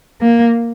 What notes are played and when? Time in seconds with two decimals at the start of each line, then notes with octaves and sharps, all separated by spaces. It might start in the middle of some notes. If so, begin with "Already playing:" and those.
0.21 A#3